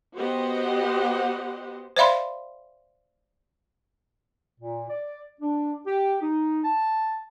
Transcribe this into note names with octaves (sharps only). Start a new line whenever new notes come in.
B3 F#4 G4 C5 D#5 F#5
C5 D5 E5 F5 B5 C6
A#2
D5
D4
G4
D#4
A5